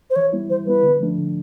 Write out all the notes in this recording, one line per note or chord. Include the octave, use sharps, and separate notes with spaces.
C5
E3 C#5
G3 B3 E4
E3 C5
G3 B3 E4 B4
D3
F3 A3 D4
D3